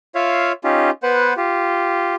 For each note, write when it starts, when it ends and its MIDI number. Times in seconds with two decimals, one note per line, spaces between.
0.15 0.52 65
0.15 0.52 73
0.15 0.52 76
0.15 0.52 77
0.64 0.90 61
0.64 0.90 63
0.64 0.90 65
0.64 0.90 67
1.03 1.33 59
1.03 1.33 71
1.03 1.33 72
1.03 1.33 78
1.37 2.15 65
1.37 2.15 67